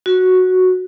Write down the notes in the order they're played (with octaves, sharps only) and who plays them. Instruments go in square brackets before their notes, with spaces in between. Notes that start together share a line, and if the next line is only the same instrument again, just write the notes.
[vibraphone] F#4